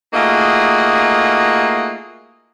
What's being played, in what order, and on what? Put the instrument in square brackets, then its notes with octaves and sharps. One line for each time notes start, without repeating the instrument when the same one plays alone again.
[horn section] A3 A#3 D#4 F4 F#4 G#4